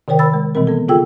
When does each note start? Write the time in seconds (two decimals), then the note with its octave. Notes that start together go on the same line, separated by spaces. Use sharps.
0.08 C3 D#3 A#4 C5 G5
0.19 B5 E6 A6
0.34 G#3
0.55 B2 E3 G3 C4 A#4
0.67 B3 A4
0.88 C#3 F4 G#4 A4 G5 E6